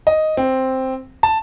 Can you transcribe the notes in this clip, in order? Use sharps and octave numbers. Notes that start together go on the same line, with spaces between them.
D#5
C4
A5